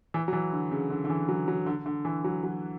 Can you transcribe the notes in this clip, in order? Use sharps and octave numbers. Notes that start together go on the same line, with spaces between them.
E3
F#3
E3
D3
C#3
D3
D3
E3
F#3
F#3
D3
D3
E3
F#3
F#3